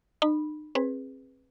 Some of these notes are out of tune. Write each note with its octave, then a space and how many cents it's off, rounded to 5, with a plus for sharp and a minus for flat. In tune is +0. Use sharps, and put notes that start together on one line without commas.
D#4 -40 B5 -10
C4 +30 G#4 +0 B4 +0